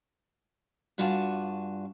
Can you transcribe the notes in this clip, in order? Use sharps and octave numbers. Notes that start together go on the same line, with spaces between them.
G2 D4 F4 F#4 G#5 A5